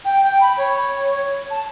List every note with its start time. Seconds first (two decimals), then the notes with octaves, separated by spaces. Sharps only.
0.04 G5
0.23 G5
0.40 B5
0.57 C#5
1.50 A5